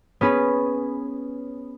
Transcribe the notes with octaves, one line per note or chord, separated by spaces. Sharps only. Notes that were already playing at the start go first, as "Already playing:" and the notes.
B3 C#4 G#4 B4